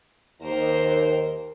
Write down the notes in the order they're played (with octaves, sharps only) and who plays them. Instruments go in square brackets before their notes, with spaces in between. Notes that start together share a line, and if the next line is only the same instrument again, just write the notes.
[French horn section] D#2 D#3 [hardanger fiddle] A#4 C5